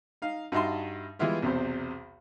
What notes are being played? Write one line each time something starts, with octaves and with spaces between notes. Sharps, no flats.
D#4 F5
G2 D#4 F#4 E5 A5 C6
E3 G3 G#3 B3 E4 F4
B1 E2 C3 C4 C5